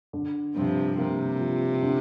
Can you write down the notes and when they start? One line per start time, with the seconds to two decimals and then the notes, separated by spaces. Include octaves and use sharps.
0.13 D3
0.56 G2 C3 F3
0.98 C3 A#3
1.40 F3
1.82 D3